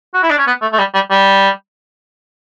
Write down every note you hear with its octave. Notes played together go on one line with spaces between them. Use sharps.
F#4
E4
D4
C#4
B3
A3
A3
G3
G3
G3